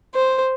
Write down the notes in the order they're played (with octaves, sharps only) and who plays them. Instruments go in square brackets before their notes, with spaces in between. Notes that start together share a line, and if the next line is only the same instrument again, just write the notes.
[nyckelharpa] C5